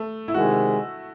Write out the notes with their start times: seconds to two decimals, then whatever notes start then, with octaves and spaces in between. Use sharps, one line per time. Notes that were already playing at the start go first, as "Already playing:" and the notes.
Already playing: A3
0.28 E4
0.34 C3 D#3 G#3 F#4